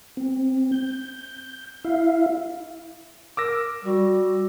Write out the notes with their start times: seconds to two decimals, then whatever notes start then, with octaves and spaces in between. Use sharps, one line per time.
0.17 C4
0.72 G6
1.84 E4 E5 F5
3.37 A#4 D6 E6 A#6
3.85 G3 F#4